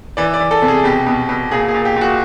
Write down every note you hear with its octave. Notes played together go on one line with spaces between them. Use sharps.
E3 D5
D5
E3
A4
C3
G#4
B2 G4
B2
B2
A#2 G#4
G#4
A#2
G4
A#2 F#4